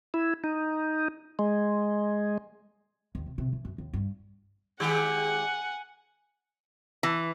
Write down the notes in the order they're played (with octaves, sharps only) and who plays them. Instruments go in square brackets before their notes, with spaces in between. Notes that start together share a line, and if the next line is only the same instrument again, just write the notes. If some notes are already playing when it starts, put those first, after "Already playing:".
[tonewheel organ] E4
D#4
G#3
[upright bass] D#2
C3
C3
E3
F#2
D#2
G2
[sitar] D#3 G#3 G4 [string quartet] F#5 G#5
[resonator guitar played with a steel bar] E3